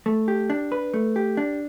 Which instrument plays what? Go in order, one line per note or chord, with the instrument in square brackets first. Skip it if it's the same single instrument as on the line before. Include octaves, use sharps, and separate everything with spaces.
[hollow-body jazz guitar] A3
G4
D4
B4
A3
G4
D4